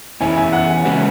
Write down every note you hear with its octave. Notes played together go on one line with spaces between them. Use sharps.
E2 E3 C#4 E4 G#5
G#5
F#5
C#3 G#3 C#4 F#4 B4